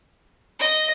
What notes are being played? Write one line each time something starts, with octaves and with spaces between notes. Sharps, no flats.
D#5